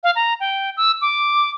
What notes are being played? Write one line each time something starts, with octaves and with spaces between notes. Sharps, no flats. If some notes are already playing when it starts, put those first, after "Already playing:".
F5
A#5
G5
E6
D6